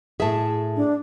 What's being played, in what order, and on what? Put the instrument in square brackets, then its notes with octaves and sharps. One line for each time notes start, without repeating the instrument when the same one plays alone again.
[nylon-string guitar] A2 E5 [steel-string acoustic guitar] G#4 A5
[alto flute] D4